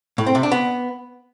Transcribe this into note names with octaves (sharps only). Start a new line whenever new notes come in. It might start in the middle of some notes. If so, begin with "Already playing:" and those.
A2
C4
C3
D4
B3